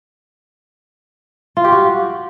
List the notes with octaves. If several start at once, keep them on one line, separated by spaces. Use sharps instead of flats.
F4
G4
F#4